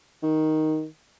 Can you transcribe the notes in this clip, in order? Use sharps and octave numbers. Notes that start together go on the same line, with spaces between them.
D#3